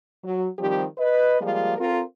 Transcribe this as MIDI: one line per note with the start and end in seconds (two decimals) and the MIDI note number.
0.24 0.46 54
0.58 0.83 51
0.58 0.83 53
0.58 0.83 55
0.58 0.83 60
0.58 0.83 67
0.97 1.36 71
0.97 1.36 75
1.40 1.74 53
1.40 1.74 55
1.40 1.74 56
1.40 1.74 58
1.40 1.74 65
1.78 2.00 60
1.78 2.00 65
1.78 2.00 69
1.78 2.00 70